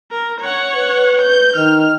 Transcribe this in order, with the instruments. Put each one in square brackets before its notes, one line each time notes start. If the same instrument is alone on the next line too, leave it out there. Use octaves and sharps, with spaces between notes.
[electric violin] A#4
C#5 F#5
[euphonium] B4
[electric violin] G6
[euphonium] D#3 [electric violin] F6